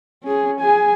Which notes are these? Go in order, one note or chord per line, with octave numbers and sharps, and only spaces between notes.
C#4 G#4
G#4 G#5